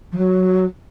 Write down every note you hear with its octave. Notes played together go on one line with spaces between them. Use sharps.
F3
F#3